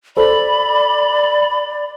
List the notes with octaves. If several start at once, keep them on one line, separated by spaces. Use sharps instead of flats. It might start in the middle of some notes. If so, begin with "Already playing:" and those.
A4 C5 D5 B5